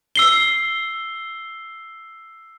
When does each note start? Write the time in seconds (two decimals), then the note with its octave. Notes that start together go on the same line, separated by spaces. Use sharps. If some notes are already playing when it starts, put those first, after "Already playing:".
0.16 E6 C7 G7